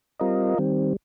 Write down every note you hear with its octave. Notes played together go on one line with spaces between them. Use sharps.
G3 C4 F4 A#4 D#5
D#3 G3 C4